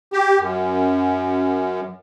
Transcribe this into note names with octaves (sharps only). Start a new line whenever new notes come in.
G4
F#2